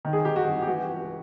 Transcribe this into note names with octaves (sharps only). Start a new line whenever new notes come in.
D#3
G#4
D#3 G4
F#4
C2
G4
E3 F#4
C#2